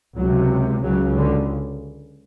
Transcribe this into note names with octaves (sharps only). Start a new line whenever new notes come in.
C#2 C3 F#3
C#2 C#3 F#3
D3